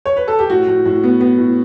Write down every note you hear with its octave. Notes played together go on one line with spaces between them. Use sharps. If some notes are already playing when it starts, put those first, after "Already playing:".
C#5
B4
A4
G4
A2 F#4
A2
A2
B3
B3
A2